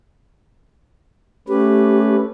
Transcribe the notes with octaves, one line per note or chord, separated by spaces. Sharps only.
A3 C#4 G4 B4